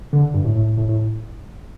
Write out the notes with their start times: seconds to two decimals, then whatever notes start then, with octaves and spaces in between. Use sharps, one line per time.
0.13 D3
0.34 G2
0.45 A2
0.56 A2
0.78 A2
0.89 A2